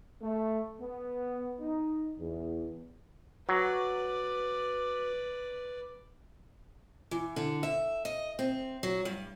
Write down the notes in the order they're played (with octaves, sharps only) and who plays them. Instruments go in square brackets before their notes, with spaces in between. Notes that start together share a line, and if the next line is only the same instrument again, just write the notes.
[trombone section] A3
B3
D#4
E2
[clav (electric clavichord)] F#3 [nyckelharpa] B4 D5
[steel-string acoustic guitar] E3
D3
E5
D#5
C4
F#3
G2